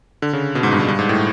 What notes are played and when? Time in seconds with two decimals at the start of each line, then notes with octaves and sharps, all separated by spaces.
0.22 D3
0.33 C#3
0.55 B2
0.63 G#2
0.72 G2
0.79 G#2
0.88 G2
0.99 G#2
1.09 A2